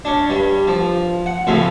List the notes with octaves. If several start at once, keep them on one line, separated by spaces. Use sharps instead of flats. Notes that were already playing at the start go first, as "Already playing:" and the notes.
C#4 D4
G2 G3
F3
F#5
A2 C#3 F3 C4